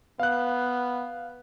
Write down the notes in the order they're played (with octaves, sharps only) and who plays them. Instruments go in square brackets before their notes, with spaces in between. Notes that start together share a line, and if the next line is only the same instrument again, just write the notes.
[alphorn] B3 [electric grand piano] F5 F#6